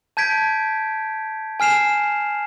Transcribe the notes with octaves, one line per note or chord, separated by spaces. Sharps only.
A5 G6 G#6 B6 D7
G#5 F6 C7 E7 F7